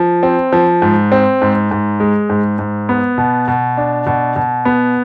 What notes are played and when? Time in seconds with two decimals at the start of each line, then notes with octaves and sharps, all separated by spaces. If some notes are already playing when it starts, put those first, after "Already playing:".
Already playing: F3
0.23 C4
0.53 F3
0.82 G#2
1.12 C4
1.42 G#2
1.71 G#2
2.00 G#3
2.30 G#2
2.59 G#2
2.89 B3
3.18 B2
3.48 B2
3.77 D4
4.06 B2
4.36 B2
4.65 B3